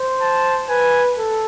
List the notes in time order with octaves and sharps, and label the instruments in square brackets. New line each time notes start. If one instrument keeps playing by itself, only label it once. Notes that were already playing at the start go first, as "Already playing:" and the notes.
Already playing: [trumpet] C5
[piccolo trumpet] A5
[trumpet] B4 [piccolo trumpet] G#5
[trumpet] A4